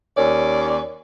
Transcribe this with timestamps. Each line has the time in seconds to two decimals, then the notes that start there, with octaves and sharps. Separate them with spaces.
0.16 D#2 C#4 A#4 C#5 D5